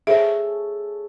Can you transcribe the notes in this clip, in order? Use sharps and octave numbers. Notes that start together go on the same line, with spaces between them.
G#4 A4 C5 C#5 E5